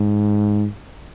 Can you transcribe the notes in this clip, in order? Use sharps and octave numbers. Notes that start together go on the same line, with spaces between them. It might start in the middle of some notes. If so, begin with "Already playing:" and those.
Already playing: G#2